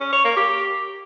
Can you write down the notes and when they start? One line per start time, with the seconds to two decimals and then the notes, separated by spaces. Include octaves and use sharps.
0.01 C#4
0.13 C#5
0.24 A#3
0.36 G4